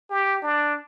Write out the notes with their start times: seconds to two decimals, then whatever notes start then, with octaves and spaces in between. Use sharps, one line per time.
0.10 G4
0.42 D4